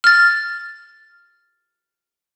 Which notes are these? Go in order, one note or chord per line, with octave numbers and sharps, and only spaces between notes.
F6 A6